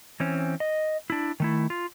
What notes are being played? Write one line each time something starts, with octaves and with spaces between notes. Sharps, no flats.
E3 C4 C#4
D#5
D4 E4
D#3 A3 E4
F4